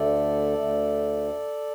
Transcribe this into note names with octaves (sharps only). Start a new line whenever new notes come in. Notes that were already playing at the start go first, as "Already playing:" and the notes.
Already playing: D2 D3 A3 A4 D5
D2 D3 A3